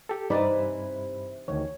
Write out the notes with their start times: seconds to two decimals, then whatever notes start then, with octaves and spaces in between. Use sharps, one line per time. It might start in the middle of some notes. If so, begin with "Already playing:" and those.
0.09 G4 A4
0.30 G2 C3 E3 D#4 B4 D5 B5
1.48 D2 D#3 C#5